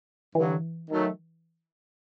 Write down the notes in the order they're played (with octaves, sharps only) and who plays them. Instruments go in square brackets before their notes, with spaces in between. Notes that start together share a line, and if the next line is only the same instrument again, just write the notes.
[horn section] G2 D3 F#3 [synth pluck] E3
[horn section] D#3 F#3 A3